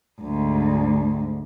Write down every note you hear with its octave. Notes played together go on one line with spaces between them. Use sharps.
D2 G#2